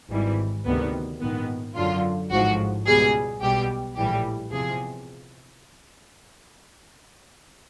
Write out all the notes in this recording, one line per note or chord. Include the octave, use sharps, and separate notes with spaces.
G#1 G#2 E3 G3
D2 C3 D#3 G3 B3
A#1 G#2 D#3 B3
F#2 D3 F#3 F4
A1 G#2 F3 F#4
C#2 B2 G3 G#4
B1 B2 G3 G4
A#1 A2 E3 G3 G4
E2 C3 F3 G#4